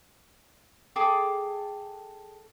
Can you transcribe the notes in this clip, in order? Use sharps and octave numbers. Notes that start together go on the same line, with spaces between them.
G#4 A4 G5 D6